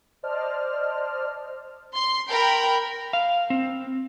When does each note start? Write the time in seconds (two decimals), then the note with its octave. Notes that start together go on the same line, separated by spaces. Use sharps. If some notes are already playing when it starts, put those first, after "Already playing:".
0.23 C5 D5 D#5 A5 F6
1.95 C6
2.29 A#4 G5 B5
3.13 F5
3.50 C4